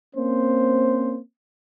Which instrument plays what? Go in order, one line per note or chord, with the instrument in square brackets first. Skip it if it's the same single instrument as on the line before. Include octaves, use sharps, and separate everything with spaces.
[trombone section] A#3 C4 C#4 C5